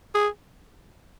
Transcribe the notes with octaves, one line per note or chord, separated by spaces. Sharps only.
G#4